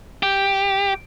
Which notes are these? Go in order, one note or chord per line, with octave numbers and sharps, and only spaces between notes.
G4